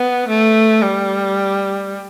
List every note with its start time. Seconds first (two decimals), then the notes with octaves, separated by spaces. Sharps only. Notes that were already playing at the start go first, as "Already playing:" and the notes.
Already playing: B3
0.28 A3
0.82 G3